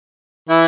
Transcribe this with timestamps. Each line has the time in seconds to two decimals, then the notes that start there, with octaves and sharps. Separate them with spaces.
0.49 E3 E4